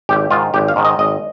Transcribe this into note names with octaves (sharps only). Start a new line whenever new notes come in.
G#1 G4
G#2 D#3 F4
G#1 G4
F5
G#2 D#3
D#5
G#1 D#5